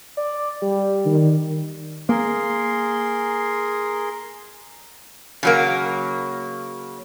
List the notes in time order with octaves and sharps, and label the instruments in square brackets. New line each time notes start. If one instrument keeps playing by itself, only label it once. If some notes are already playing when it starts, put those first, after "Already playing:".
[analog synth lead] D5
G3
[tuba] D#3
[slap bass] A#3 [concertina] G#4 A#4 C6
[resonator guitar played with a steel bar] C#3 F#3 A#3